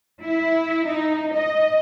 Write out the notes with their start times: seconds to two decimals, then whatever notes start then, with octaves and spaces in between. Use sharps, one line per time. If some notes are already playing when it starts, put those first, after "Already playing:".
0.23 E4
0.87 D#4
1.35 D#5